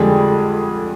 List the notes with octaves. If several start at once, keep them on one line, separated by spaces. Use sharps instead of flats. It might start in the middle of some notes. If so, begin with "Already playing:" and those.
Already playing: F2 D3 G3 G#3 G#4